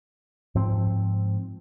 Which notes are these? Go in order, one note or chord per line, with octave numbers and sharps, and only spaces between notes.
G#2 F3 C4